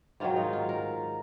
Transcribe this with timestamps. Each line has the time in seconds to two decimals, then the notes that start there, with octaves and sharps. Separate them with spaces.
0.20 G#2 D#3 F#3 F4
0.36 D#4
0.53 F4
0.69 A#4